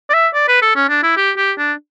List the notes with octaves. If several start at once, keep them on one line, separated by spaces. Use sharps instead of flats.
D5
E5
D5
B4
A4
C#4
D4
E4
G4
G4
D4